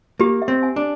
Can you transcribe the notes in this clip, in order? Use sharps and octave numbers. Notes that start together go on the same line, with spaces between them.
A#3 G4
E5
C4
G#5
D4